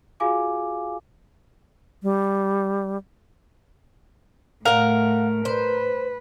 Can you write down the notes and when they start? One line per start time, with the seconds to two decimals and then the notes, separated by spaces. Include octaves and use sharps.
0.20 F4 F#4 G#4 F5 G#5 D6
2.03 G3
4.65 A2 A3 A#4 F5 F#5
5.45 B4 C5